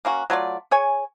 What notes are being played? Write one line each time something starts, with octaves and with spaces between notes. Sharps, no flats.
A#3 C#4 F#4
F#3 A3 F4 D5
G#4 C#5 G#5